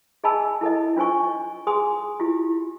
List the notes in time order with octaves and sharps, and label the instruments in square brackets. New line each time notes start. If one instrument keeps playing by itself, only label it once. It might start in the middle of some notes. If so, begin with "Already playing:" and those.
[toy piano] G#4 D#5 G#5 A5 B5 E6
E4 A4 D#5
D4 F4 C5 G#5 C#6
G#4 G#5 C6 D#6
E4 F4 G4